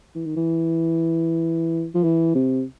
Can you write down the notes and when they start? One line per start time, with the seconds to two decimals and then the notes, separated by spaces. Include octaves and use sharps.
0.15 E3
0.26 D#3
0.36 E3
1.95 F3
2.03 E3
2.35 C3